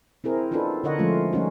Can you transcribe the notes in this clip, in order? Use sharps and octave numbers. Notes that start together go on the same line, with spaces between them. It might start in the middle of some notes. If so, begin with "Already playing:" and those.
C4 E4 G#4 A#4
B3 D4 D#4 F4 A4 B4
D3 A#4 C#5 D#5 F#5
F3 G#3 A3 C#4 F4
G3 A3 C#4 D#4 F#4